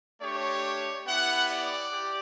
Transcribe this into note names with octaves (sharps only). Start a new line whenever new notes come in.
A3 D4 G4 C#5
B3 E4 G4 F#5
D5
G4